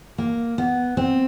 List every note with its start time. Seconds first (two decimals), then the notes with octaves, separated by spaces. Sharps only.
0.18 A#3
0.58 B3
0.97 C4